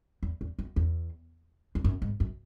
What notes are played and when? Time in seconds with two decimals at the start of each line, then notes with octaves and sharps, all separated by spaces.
0.23 E2
0.41 E2
0.59 F#2
0.76 E2
1.75 E2
1.84 F#2
2.02 G#2
2.20 F#2